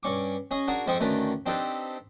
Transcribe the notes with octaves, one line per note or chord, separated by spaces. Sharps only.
G2 C#4 C#6 D6
C#4 G#4 D#5
D4 F#4 G#4 A#4
F2 G#3 C4 G5 C#6 D#6
D2 D#3 C#4 D4 B4
C4 D4 D#4 G4 A4 B4